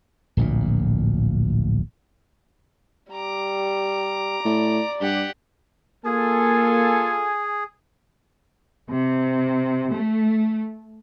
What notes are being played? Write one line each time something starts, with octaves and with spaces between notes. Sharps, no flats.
D1 A#1 A#2
G3 A#5 D6
A2 D5
G2 G4 F#5
A#3 F4 G#4 A4 G#5
C3
A3